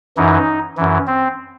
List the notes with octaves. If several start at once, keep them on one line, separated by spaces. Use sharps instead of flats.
F#2 E3 D#4
F#2 E3
C4